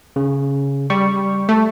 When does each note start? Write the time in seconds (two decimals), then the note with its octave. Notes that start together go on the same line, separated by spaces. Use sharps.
0.16 C#3
0.90 G3 C#6
1.49 A3